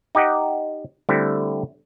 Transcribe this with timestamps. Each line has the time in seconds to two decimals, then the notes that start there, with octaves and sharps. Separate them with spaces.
0.15 D#4 G4 D#5 F#5
1.09 D3 G3 A3 C4 E4 A4